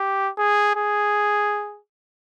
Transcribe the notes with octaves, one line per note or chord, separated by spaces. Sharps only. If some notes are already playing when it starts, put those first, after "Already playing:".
Already playing: G4
G#4
G#4